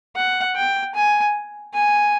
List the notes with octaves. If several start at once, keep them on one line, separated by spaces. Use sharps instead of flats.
F#5
G5
G#5
G#5